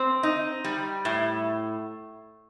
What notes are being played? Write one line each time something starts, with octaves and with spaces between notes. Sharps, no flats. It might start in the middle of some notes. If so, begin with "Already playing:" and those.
Already playing: C4
D#4
G3
A2